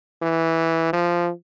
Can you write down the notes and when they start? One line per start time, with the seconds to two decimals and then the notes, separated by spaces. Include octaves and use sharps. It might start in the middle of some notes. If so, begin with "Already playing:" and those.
0.22 E3
0.93 F3